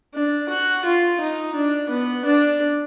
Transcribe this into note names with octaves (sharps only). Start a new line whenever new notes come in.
D4
F#4
F4
D#4
D4
B3
D4